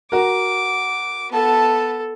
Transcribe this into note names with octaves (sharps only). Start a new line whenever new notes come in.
F#4 A#4 D6
B3 A4 A5